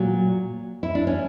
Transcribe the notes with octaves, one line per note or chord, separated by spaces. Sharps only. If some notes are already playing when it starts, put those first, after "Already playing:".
Already playing: A#2 F#3
E4
D4
C#4